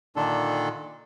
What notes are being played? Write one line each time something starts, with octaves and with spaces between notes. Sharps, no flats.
A#2 D3 D#3 D4 A4